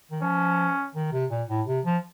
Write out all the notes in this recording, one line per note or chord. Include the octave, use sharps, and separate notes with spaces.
D#3
F3 C#4
D#3
C3
A#2
A2
C3
F3